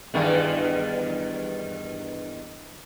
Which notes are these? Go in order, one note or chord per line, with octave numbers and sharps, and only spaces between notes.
E2 G2 D#3